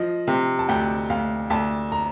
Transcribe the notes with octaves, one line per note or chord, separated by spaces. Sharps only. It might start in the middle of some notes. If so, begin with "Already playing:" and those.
Already playing: F3 D#5
C3
A5
D2 G5
D2 F5
D2 A5
A#5